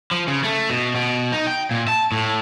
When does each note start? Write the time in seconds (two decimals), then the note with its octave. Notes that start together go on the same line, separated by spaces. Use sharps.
0.11 F3
0.28 C#3
0.43 A3
0.70 B2
0.95 B2
1.32 D#4
1.47 G5
1.71 A#2
1.88 A5
2.12 A2